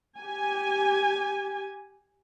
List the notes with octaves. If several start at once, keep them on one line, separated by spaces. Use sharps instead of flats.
G4 G#5